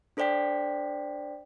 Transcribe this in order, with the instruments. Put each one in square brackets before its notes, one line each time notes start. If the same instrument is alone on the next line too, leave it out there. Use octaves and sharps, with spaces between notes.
[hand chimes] D4 A4 C5 D5 G5 B6